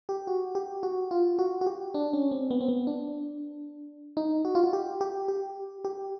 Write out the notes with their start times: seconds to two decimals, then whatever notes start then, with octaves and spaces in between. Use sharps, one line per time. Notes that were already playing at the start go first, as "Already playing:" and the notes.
0.09 G4
0.27 F#4
0.55 G4
0.83 F#4
1.11 F4
1.39 F#4
1.61 F#4
1.66 G4
1.94 D4
2.13 C#4
2.31 C4
2.51 B3
2.61 C4
2.68 B3
2.87 D4
4.17 D#4
4.45 F#4
4.55 F4
4.64 F#4
4.73 G4
5.01 G4
5.28 G4
5.85 G4